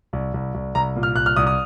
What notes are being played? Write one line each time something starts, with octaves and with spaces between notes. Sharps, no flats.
C2
C2
C2
C2 A#5
A#2
F6
C2 F#6
F6
C2 D#6
D#6